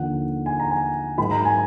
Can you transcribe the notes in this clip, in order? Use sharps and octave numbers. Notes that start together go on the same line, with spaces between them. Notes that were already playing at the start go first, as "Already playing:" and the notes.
Already playing: D#2 D3 F3 F#5
G#5
A#5
G#5
G#2 D#3 F#3 B5
A#5
G#5